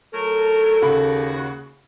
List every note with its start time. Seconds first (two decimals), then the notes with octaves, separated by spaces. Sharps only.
0.14 F#3 A3 A4 A#4
0.82 D#2 C#3 F#4 B5